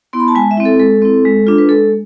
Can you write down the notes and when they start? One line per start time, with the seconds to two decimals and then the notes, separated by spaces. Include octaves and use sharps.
0.13 B3 E4 C6
0.20 B5
0.28 A5
0.35 G#3 G#5
0.51 E5
0.57 C4 E4
0.65 A4
0.80 G#3 A4
1.02 C4 E4
1.25 G#3
1.47 D4 F4
1.58 B4
1.69 G#3 A4